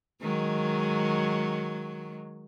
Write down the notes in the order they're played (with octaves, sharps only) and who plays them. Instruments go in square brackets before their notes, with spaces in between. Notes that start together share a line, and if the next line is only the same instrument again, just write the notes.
[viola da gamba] D#3 F#3 G#3